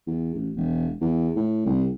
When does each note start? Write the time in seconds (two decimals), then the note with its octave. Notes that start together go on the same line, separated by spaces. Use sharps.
0.07 E2
0.35 A1
0.56 E1
1.01 E2
1.36 A2
1.66 C2